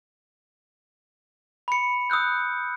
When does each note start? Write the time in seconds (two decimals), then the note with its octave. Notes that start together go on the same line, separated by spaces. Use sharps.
1.68 B5 C#7
2.10 D#6 E6 F#6 G6